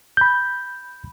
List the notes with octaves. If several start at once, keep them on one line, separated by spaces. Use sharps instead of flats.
B5 G6